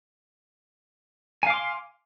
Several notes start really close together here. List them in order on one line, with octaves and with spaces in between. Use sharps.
G#5 F5 D6 C6